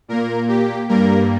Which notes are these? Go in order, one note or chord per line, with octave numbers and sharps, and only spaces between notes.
A#2 A#3 A#4
G4
G2 G3 A#3 A#4